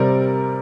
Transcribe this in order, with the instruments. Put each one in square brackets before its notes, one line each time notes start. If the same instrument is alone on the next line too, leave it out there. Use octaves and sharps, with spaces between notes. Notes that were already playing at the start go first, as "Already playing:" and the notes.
Already playing: [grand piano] C3 G3 C4 A#4 D5